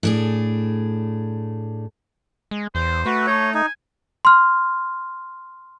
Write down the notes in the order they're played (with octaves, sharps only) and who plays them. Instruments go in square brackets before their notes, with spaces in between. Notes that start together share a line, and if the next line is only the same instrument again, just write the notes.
[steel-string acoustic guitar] A2 D4 G#4
[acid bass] G#3
[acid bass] E2 [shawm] C5
[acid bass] A3 [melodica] F#4 B4
[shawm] D#4 [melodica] C#5
[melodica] D#4 [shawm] G#5
[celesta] C6 F6